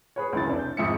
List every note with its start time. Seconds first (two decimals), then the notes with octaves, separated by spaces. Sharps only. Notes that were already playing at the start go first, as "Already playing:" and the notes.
0.16 G#4 B4 C#5
0.33 C#2 F#2 E3 E4 A6
0.47 F1 D4
0.59 G6
0.77 G#1 F2 G#3 E5 C#7